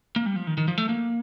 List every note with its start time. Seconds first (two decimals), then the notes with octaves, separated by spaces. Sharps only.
0.16 A#3
0.26 G3
0.36 F3
0.47 D#3
0.58 D#3
0.68 F3
0.78 A3
0.89 A#3